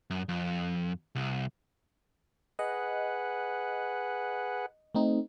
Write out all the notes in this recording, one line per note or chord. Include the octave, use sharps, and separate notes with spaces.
F#2
F2
C2
G#4 B4 D#5 F#5
A3 C4 D#4